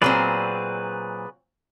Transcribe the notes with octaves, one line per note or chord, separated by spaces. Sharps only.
A#2 F#3 C4 G#4 B4 D5